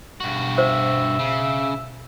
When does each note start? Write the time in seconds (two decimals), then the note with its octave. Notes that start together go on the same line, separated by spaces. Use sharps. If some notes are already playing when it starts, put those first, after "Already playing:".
0.20 G2 B2 F#4
0.58 C5 E5
1.19 C#3